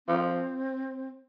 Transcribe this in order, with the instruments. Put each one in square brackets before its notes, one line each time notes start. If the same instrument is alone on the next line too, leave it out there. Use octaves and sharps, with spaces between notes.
[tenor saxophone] F3 [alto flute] C4